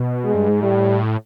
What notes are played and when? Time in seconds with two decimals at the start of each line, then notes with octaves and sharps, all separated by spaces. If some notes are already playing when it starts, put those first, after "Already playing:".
Already playing: B2
0.24 G#3
0.35 G2
0.48 G#2
0.63 A2 G3